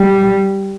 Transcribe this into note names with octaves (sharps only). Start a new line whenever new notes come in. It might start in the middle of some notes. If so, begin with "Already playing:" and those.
Already playing: G3